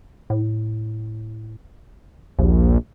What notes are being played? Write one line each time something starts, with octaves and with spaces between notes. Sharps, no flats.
A2
A#1 D#2